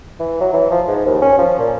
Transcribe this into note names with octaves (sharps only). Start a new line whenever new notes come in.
E3
F#3
E3
F3
G#2
D#2
C#4
F3
A#2